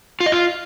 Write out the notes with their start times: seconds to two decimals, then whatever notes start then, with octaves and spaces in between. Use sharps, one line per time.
0.20 F4
0.26 D#5
0.32 F4